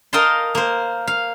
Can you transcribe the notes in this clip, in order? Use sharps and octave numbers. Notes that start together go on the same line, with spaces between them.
A#4 D#5 F5 G5 A5 C6
A#3 C5
F5